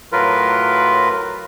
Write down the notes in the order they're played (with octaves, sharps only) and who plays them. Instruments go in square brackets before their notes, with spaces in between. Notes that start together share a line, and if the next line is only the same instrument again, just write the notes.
[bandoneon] A2 F#3 F4 A#4 B4